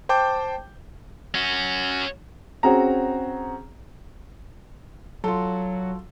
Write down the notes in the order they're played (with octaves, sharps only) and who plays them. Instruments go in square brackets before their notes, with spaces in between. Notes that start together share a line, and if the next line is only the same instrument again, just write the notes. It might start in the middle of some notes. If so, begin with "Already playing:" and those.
[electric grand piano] C5 G5 A5 D6 G6
[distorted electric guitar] C#4 F#4
[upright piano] C4 C#4 F#4 G#4 A#5
[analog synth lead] F#3 [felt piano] F4 A4